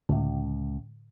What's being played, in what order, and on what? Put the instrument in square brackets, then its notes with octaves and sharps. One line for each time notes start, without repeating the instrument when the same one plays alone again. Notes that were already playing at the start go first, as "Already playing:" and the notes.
[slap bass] C#2 [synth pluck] A2 D3